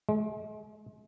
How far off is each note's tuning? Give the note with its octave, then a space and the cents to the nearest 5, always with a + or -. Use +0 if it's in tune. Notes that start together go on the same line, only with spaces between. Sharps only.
G#3 +40